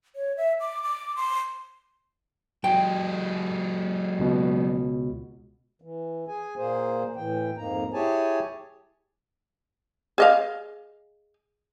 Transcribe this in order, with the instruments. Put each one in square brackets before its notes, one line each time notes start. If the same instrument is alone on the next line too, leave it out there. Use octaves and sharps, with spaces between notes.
[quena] C#5
E5
D6
D6
C6
[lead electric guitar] F#3 G#3 [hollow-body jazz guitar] G5
[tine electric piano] C#2 B2
[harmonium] E3
G#4 G#5
A#2 A#3 G#4 C5
A2 E3 G5
F2 G#2 A#3 D#4 A#5
E4 G4 G#4 C#5 G#5 A5
[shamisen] G#4 D#5 F5